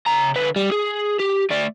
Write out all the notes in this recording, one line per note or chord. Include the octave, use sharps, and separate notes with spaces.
C#3 A#5
D3 B4
G3
G#4
G4
A3 D5